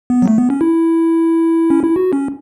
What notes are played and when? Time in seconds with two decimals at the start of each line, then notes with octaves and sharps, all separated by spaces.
0.10 B3
0.22 F#3
0.28 A3
0.38 B3
0.50 C#4
0.61 E4
1.70 C#4
1.84 E4
1.96 F#4
2.13 C#4